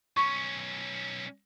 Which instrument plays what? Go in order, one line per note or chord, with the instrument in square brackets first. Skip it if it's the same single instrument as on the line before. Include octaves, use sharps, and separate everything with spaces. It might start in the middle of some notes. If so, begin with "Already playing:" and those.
[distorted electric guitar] B1 C#4 [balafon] C#6